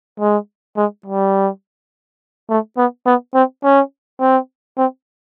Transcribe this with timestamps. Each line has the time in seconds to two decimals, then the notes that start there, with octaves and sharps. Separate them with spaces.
0.20 G#3
0.77 G#3
1.06 G3
2.50 A3
2.77 B3
3.06 B3
3.34 C4
3.64 C#4
4.21 C4
4.77 C4